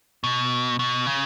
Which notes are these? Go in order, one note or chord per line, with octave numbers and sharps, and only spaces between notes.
B2
B2
C#3